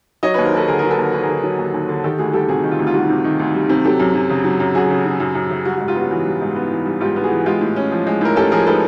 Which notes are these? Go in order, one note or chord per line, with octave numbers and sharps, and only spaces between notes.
F#3 C#5 D#5
D#2 B4 C#5
A#4 C5
D#2 A4 B4
D3 G#4 A#4
F#3 G#4 A#4
A4 B4
D#2 A#4
D#2 B4
G#4 A#4
D3
F#3
D#2
D#2
D3
D#3 G4 A4
D2 F#4 G#4
G3 G4 A4
C3 F#4 G#4
D#3
F4
D2
F4
G3 F#4
C3
D#3
D2
G3
C3
F#3 G4 A4
F#2
F#2
C#3
F#3
F#2
F#2 F#4 G#4
C#3
F#3
F#2
F#2
C#3
G3 F#4
G#2 F#4
F4 G4
B3 F#4
E3 F#4
G3
G#2
B3
E3
G3
G#2 F4 G4
B3
F#4 G#4
E3
G#3 F4 G4
A2
C#4
F3
G#3
A2 A#4
C#4 G4 A4
F3 G#4 A#4
G#3 A4 B4